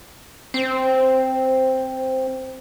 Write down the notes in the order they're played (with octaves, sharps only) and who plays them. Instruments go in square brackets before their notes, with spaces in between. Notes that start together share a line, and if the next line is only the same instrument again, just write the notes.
[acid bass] C4 [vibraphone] C5